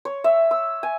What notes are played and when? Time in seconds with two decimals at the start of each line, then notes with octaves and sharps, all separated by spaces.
0.05 C#5
0.24 E5
0.51 E6
0.83 G#5